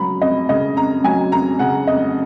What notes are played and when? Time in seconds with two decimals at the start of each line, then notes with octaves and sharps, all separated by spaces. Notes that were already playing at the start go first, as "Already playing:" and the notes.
Already playing: C#3 F#3 A#5 B5
0.21 F2 D#5
0.49 C#3 D#5
0.76 F2 A#5
1.04 F#3 G#5
1.32 F2 A#5
1.59 C#3 F#5
1.87 F2 D#5